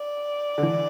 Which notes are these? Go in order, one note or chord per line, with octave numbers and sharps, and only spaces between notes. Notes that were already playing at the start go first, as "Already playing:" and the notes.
Already playing: D5
D3
E3